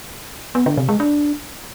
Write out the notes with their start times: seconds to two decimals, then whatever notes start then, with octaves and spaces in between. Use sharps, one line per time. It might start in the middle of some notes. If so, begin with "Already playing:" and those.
0.55 B3
0.66 D3
0.77 C3
0.89 G#3
1.00 D4